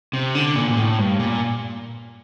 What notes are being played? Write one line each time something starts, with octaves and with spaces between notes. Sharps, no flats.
C3
D3
A#2
A#2
A2
G2
A#2